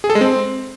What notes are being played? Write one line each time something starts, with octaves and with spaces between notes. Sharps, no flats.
G#4
A4
G#3
C4